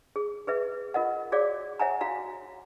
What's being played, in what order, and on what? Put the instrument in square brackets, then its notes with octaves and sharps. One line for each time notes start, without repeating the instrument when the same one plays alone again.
[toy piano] G#4
G#4 B4 E5
F4 A#4 D#5 F#5
F#4 G#4 C#5 D5 F5 D6
C#5 E5 F#5 G#5 A#5
F#4 F5 A#5